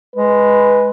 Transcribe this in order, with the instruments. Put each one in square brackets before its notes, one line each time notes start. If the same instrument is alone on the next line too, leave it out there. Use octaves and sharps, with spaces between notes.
[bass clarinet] G#3 [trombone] B4